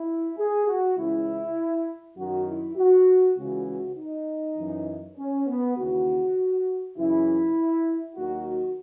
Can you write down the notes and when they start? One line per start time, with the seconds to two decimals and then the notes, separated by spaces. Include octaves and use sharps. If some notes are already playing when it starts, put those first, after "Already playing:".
Already playing: E4
0.37 G#4
0.67 F#4
0.97 C#2 C#3 E3 E4
2.17 F#2 D#3 F#3 F#4
2.47 E4
2.76 F#4
3.36 C#2 C#3 E3 F#4
3.67 F#4
3.97 D#4
4.57 F#2 E3
5.16 C#4
5.47 B3
5.76 D#2 C#3 E3 F#4
6.96 F#2 C#3 E3 E4
8.16 D#2 D#3 F#3 F#4
8.46 F#4